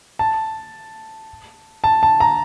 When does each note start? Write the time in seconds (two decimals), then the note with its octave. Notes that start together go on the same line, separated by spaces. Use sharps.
0.19 A5
1.84 A5
2.03 A5
2.20 A#5